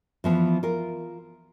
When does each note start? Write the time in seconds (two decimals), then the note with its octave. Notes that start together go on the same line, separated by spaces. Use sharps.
0.24 E3 F3 B3
0.63 F4 A#4